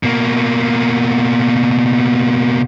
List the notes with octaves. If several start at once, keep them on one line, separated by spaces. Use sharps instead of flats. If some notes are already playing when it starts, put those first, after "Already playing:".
B2 A#3